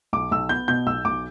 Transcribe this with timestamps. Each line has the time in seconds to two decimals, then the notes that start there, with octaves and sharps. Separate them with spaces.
0.13 B1 D6
0.31 B1 E6
0.49 B3 G6
0.68 B2 G6
0.86 B1 E6
1.05 B1 D6